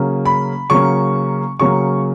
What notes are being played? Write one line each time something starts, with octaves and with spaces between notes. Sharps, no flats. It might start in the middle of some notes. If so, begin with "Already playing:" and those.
Already playing: C#3 F#3 A#3 C#4
B5
C#3 F#3 A#3 C#4 C#6
C#3 F#3 A#3 C#4 C#6